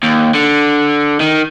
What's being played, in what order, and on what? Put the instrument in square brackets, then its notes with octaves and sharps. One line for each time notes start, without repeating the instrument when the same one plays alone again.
[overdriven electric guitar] D#2
D3
D#3